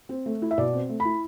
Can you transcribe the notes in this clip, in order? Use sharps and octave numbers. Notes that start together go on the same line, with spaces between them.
C4
A3
E4
E5
B2 D5
C4
A3
B5
E4